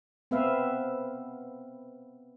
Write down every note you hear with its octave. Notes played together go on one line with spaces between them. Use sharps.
B3 C4 B4 E5 F5